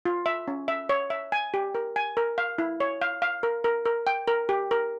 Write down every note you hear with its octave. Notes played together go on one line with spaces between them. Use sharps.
F4
E5
C#4
E5
C#5
E5
G#5
G4
A#4
G#5
A#4
F5
E4
C#5
F5
F5
A#4
A#4
A#4
G5
A#4
G4
A#4